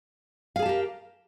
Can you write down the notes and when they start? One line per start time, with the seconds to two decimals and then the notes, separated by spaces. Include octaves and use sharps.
0.56 F5
0.59 G#4
0.62 A5
0.66 G4
0.69 A#4